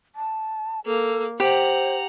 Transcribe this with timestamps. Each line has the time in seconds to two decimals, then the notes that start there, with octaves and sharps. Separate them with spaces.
0.15 A5
0.85 A#3 A4
1.40 G4 C5 F#5 A#5